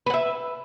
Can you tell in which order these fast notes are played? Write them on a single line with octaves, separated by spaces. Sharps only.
B4 F#5 E5